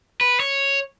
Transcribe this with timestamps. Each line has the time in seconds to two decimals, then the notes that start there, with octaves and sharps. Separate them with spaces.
0.21 B4
0.40 C#5